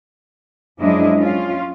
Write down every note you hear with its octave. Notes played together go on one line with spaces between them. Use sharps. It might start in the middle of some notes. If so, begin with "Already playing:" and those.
F#2 F3 G#3 D4 E4 D#5
C#4 F4